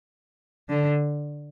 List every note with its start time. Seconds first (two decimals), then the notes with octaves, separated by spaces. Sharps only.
0.69 D3